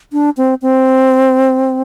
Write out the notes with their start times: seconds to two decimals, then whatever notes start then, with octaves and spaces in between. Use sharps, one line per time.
0.13 D4
0.37 C4
0.62 C4